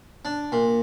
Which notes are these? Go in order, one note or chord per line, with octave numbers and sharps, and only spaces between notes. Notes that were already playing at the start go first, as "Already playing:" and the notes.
D4
A#2